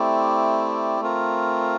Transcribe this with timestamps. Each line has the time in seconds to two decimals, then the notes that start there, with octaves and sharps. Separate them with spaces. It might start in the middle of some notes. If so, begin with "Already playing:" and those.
Already playing: A3 C4 E4 G4 D5
1.01 A3 C4 F4 A#4